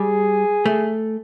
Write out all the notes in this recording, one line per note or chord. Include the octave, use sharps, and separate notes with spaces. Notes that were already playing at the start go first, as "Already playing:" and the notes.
Already playing: G3 G#4
A3